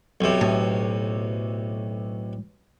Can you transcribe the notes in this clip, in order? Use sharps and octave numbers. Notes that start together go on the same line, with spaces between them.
B1 C3
A2